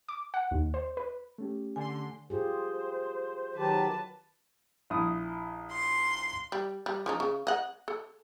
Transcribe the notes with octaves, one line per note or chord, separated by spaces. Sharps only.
D6
F#5
D#2
C5
B4
A3 C#4 G4
D3 G#5 C6
F4 G4 G#4 C5
D#3 F#3 G4 B4 A5
A#1 E4 D#6
C6
G3
G3
F3 C#4 D#4
C#3
D#5 F#5
A4